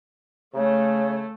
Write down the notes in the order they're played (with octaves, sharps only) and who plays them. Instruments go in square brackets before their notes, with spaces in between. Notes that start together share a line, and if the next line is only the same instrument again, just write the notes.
[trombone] C#3 [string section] A3 [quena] C#5